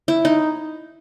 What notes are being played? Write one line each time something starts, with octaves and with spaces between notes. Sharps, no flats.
E4
D#4